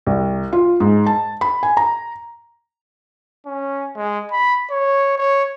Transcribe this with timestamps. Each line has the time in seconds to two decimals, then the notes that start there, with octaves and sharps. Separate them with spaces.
0.07 C2
0.53 F4
0.80 G#2
1.06 A5
1.41 B5
1.63 G#5
1.77 A#5
3.46 C#4
3.96 G#3
4.32 B5
4.71 C#5
5.18 C#5